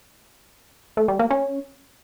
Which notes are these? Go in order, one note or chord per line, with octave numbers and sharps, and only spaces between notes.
A3
G3
A#3
C#4